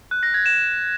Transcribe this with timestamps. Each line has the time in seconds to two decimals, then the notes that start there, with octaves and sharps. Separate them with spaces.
0.11 F#6
0.23 A#6
0.34 G#6
0.46 E7